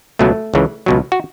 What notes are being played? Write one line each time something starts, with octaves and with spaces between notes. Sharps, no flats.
C#2 B2 F#3 A3
C#2 C#3 E3
C#2 B2 F#3
F#4